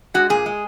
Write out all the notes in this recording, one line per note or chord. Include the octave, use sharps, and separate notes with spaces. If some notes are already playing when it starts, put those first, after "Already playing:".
G#3 F#4
A#2 G#4
G#3